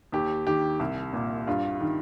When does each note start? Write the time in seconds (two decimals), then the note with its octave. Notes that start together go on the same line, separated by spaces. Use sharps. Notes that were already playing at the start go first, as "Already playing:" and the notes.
0.12 D#2 G4
0.47 D#3 G4
0.80 C2
1.13 A#2
1.47 G2 F4
1.80 D#3